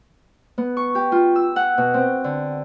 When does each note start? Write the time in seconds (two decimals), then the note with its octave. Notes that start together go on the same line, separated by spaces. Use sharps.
0.58 B3
0.77 C#6
0.95 G4
1.12 F4
1.36 E6
1.56 F#5
1.78 B2
1.94 C4
2.24 D3